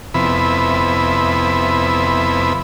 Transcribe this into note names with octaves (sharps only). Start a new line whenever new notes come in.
F2 C3 B3 E4 B5